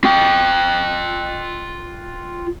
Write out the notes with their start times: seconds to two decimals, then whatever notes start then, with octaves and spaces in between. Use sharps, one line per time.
0.04 F4 G5